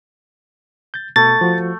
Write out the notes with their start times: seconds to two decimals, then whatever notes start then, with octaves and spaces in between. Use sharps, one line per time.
0.94 G6 A6
1.16 B2 A3 A6
1.41 F3 F#4